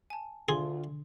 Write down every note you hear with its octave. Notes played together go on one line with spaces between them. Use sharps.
G#5 A5
D2 D3 F4 G#4 C6